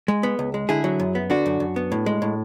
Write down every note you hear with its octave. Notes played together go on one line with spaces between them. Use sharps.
G#3
B3
C#2
G#3
D3 E4 G#4
F#3
F#2
B3
D3 D4 F#4
F#2
F#2
B3
A2
G#3
A2